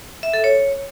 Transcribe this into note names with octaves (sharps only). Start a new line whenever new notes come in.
E5
A4
C#5